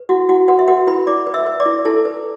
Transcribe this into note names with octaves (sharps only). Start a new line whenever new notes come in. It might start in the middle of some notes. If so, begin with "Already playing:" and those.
Already playing: B4
E4 F#4 F#5
E4 F#4 F#5
F#4 B4 F#5
E5
F#4 B4 F#5
E4 B4 B5
E4 D5 D6
B4
E5 E6
B4
D5 D6
E4
E4 A4 A5
B4